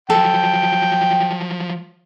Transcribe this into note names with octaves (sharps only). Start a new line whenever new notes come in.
F3 F#3 A4 G5